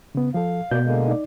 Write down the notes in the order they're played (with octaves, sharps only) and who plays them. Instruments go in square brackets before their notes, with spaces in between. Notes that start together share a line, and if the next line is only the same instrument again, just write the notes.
[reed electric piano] C#3 B3
[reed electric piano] F3 A4 [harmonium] F5
[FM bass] B2 [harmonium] A#3 B3 D5 [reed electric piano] G6
[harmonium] D3 G#3 A#3
[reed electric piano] D#4 D5